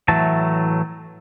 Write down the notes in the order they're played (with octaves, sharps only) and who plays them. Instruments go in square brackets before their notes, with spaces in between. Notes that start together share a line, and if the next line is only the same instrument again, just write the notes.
[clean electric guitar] A2 E3 F#3 A3 A5